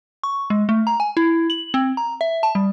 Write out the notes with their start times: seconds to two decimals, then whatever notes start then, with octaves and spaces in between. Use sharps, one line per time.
0.24 C#6
0.50 G#3
0.69 A3
0.87 A#5
1.00 G#5
1.17 E4
1.50 F#7
1.74 C4
1.97 A#5
2.21 E5
2.43 A5
2.55 G3